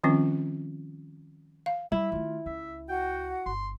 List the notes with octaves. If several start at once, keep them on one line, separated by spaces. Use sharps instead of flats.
D#3 F3 G3 C4 C#4 F4
F5
G3 E4 E5
D#3 A3 F4
C#2 E5
F#4 F#5 G5
G1 C6